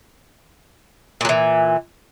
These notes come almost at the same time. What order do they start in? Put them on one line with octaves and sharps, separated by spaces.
A#2 F#3 E3